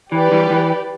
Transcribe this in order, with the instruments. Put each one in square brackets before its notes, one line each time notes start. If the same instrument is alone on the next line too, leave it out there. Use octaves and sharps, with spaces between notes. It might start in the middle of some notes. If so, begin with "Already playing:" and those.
[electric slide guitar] E3 [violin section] G4 B4 D5
[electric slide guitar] E3 G3
E3